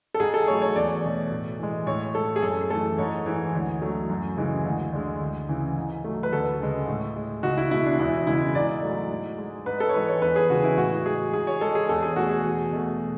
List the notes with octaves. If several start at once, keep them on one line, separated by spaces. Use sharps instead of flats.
A4
G#2 G#4
A4
F#3 A3 C#5
C#5
E2 D5
B2 A3
A2
E3 G#3
A2 C#5
G#3 A4
G#4
F#2 A4
E3 A3 A4
G#2 C#5
E3 G#3
D2
D3 F#3 A3
F#2
C#3 E3 G#3
D2
D3 G#3
D2
C#3 E3
G#2
F#3 A3
B4
D2 A4
C#3 G#3
A2
G#3
C#2 F#4
E4
B2 G#3 E4
D4
E2 E4
C#3 G#3 E4
G#2 D5
F#3 A3
G#2
G#3
G#2 B4
A4
C#5
E3 G#3 B4
C#5
E2 B4
G#4
C#3 E3 G#3 F#4
E4
A2 F#4
G#3 G#4
G#2 G#4
C#5
G#3 A4
G#4
E2 A4
G#4
B2 A3 F#4
G#4
E2
B2 A3